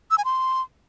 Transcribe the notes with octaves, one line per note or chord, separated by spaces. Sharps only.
E6
G#5
C6